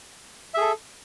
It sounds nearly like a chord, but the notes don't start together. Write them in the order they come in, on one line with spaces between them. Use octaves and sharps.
E5 G#4 A4